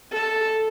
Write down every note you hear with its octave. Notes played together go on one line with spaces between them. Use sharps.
A4